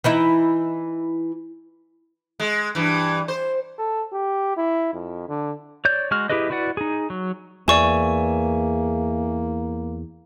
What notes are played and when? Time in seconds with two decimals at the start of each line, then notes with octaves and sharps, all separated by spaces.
0.04 E3 D#4 E4
2.40 G#3
2.75 G2 E3
3.28 C5
3.78 A4
4.13 G4
4.57 E4
4.93 F2
5.29 D3
5.85 C#5 D5 G6
6.11 G#3 F#4 F6
6.30 E4 G4 G#4 B4 D#5
6.50 E4 F#4 B4 D5 F#5
6.77 D#4 G#4
7.10 F#3
7.68 E2 A#3 D5 E5 G#5 C#6 E7